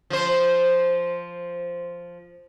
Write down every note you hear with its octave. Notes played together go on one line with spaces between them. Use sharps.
F3 C5